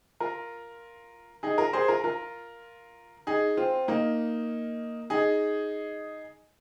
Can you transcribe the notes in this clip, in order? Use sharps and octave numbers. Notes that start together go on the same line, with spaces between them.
F4 A#4
D#4 G#4
F4 A#4
G#4 C5
F4 A#4
F4 A#4
D#4 G#4
C4 F4
A#3 D#4
D#4 G#4